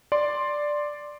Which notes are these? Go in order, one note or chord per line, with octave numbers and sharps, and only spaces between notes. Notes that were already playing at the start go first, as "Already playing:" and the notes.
D5 C6